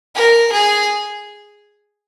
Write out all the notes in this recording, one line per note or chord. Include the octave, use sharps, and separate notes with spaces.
A#4
G#4